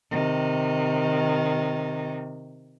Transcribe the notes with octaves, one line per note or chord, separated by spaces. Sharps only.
C3 D#3